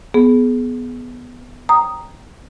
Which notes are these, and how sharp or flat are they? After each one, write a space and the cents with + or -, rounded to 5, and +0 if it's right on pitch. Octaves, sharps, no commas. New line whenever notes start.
B3 +0 G#4 +20
G5 +0 A#5 +0 D#6 +0